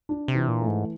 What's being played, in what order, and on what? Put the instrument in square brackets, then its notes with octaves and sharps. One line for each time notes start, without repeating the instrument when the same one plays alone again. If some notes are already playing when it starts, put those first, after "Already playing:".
[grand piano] D4
[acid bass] C3
[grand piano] E3
[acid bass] A#2
[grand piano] A3
[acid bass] G#2